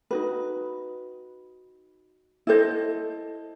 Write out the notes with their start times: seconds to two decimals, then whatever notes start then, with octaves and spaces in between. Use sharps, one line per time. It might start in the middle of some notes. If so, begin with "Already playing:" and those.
0.11 D#4 F#4 B4
2.47 E4 A4 C5 D#5